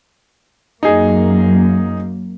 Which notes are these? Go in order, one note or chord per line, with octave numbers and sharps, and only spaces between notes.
F#2 A#3 D#4 G#4